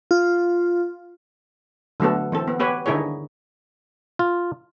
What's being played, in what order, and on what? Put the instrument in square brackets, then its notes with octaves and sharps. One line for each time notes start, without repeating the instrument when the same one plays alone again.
[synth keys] F4
[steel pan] D3 F#3 A3 B3 A4
E3 C4 A4
B3
B3 G4 B4 C#5
D3 D#3 D#4 E4 G#4 C#5
[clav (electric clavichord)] F4